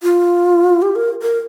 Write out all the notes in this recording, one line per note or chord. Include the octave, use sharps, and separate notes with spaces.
F4
G4
A#4
A#4